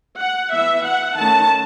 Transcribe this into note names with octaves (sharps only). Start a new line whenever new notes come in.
F#5
E3 B3 E5
F#5
D#3 A3 C#4 A5